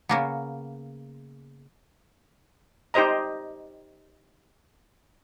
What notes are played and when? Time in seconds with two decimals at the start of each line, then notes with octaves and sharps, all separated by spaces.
0.09 C#3 A#3 B3
2.94 D#4 G4 C5 D#5 A#5